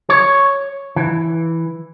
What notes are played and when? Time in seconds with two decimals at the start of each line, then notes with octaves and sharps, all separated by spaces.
0.10 C#5
0.96 E3